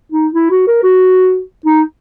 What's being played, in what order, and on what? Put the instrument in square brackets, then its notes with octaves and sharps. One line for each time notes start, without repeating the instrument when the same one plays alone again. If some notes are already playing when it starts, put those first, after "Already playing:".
[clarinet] D#4
E4
F#4
A#4
F#4
D#4